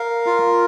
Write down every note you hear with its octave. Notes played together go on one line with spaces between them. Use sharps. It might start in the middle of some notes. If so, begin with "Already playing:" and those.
Already playing: A#4 F5
F4